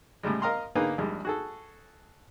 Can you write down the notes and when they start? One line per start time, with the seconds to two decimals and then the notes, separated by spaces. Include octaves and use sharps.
0.23 A2 C#3 G3 G#3
0.42 A#4 D#5 F5 A#5 C6
0.75 D3 A#3 B3 D#4 G#4 B4
0.98 A#1 G3 G#3
1.25 F#4 G#4 A4